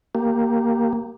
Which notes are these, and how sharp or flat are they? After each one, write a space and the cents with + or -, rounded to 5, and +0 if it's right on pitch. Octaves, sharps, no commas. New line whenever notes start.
A#3 +0 G4 +0